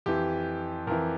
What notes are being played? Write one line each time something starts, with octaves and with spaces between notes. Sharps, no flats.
F2 E3 G4
F2 E3 A#4